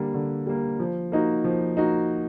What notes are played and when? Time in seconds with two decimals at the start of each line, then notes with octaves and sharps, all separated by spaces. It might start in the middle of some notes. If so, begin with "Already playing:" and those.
Already playing: D3 G3 A#3
0.14 D3
0.47 G3 A#3
0.80 F3
1.12 A#3 D#4 F#4
1.44 F3
1.77 A#3 D#4 F#4